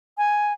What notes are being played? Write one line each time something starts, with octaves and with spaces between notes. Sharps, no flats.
G#5